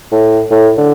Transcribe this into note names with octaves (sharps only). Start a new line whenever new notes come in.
A2
A2
D3